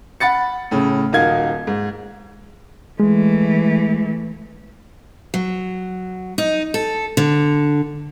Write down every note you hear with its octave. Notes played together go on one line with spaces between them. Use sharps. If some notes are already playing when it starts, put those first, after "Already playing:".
F#5 B5 A6 C#7
A2 C#3
D#1 D#4 F#4 A#4 F5 G#6
G#2
E3 G#3 A3
F#3
D#4
A4
D3